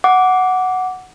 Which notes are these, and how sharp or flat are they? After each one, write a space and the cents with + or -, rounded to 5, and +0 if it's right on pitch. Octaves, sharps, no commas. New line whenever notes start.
F#5 +0 D6 -15